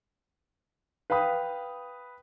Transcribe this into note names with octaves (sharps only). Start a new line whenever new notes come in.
B4 F5 G5 B5 D#6